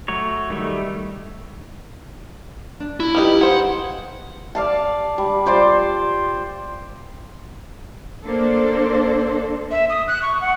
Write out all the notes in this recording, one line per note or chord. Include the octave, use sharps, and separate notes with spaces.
F#3 A3 C#5
D#3 G3 A3
D4
E4
G3 D#4 F4 G4 B4
G#4 C5 F#5
D5 F5 A5
G3
F4 C5 D5 C6
A#3 D4 A4 C5
E5
D#6
F#6
C#6
F#5